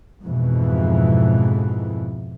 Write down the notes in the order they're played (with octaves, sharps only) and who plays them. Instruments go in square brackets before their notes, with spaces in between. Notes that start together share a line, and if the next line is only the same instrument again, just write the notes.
[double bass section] F2 G#2 B2 E3